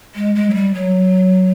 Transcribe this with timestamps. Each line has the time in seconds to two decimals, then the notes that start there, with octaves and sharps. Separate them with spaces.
0.15 G#3
0.35 G#3
0.50 F#3
0.54 G3
0.74 F#3